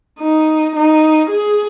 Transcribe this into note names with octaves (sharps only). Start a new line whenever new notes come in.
D#4
D#4
G#4